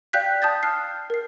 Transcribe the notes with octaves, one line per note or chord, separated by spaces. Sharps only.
D5 F5 G5 F#6 G6 B6
A5 D#6 G6 A6
F6 F#6 C7
A#4 C7